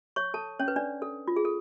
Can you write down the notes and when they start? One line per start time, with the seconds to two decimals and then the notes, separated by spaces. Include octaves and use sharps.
0.16 C#5 C#6
0.34 A4 A5
0.59 C#4 C#5
0.68 B4
0.76 D4 D5
1.02 A4
1.28 F4
1.36 G#4
1.45 A4